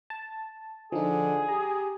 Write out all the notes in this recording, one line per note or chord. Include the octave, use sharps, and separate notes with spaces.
A5
D3 F3 D#4 G#4
G4 A#5